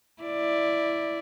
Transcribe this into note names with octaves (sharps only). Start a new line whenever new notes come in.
E4 D5